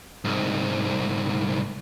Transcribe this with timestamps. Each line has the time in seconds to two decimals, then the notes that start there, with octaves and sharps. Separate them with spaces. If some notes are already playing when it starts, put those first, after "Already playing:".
0.25 C2 G#2